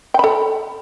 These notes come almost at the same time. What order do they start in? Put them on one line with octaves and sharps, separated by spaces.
G5 B5 A4